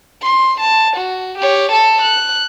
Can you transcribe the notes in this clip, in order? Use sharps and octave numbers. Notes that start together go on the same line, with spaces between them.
C6
A5
F#4
G4 C#5
A4 A5
F#6